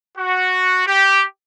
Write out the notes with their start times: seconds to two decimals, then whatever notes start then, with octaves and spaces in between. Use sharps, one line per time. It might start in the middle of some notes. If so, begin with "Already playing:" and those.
0.18 F#4
0.87 G4